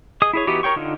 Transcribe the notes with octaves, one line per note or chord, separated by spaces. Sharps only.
G#4 D#5 D#6
E4 G#4 C#5
E3 B3 D#4 F#4 G4
A#4 C#5 G5 C#6
D3 D#4 F4